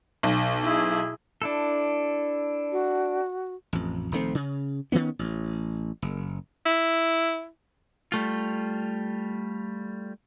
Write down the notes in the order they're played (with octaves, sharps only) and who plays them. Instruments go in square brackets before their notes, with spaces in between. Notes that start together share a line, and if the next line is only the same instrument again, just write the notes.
[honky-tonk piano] B1
[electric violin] E4 G#4
[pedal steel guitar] D4 E4 A4
[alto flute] F#4
[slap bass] A1 F2
A#1 D#3 A3 C4
C#3
D#3 F#3 B3 C#4
A1
F#1
[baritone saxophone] E4
[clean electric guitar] G3 A3 F4